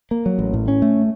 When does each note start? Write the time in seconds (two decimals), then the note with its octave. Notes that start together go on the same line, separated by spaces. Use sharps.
0.11 A#3
0.26 F#3
0.39 A1
0.53 A2
0.68 C#4
0.82 A3